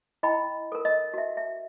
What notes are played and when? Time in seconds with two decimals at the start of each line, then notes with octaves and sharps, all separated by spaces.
0.23 E4 D#5 G5 B5
0.72 A4 A#4
0.85 D#5
1.14 F#4 E5
1.37 E5